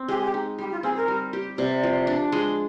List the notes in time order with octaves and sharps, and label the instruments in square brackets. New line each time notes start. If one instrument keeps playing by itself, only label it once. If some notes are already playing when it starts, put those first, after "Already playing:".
Already playing: [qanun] C4
[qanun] G#3 [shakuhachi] G4
[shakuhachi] G#4
G4
[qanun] D#4
[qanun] G3 [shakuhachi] G4
[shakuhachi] F4
[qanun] C4 [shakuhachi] G#4
[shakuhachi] A#4
[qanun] G3
G4
[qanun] C3 [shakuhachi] D5
[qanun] F3
D4
G#3